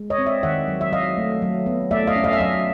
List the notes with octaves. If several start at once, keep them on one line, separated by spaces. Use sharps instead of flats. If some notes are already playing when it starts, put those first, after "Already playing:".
Already playing: G#3
C#5 D#5
C4
D5 E5
D#3 E5 F#5
F#3
E5
F#3 D#5 F5
A3
F#3
B3
A3 D5 E5
D#5 F5
C#4
D#5 F5
E5
F#3 D#5 F5